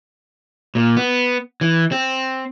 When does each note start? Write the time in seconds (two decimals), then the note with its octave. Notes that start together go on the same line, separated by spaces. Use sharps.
0.75 A#2
0.97 B3
1.61 E3
1.92 C4